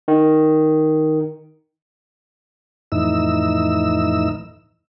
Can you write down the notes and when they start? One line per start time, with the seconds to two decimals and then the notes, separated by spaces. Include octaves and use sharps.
0.08 D#3
2.92 F2 A2 E3 D#4 E6